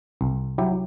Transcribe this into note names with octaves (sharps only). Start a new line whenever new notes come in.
C2
F#3 E4 G4